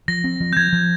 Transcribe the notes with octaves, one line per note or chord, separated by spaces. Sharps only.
F3 A#6
C4
F3
G6
F3 G#6
F3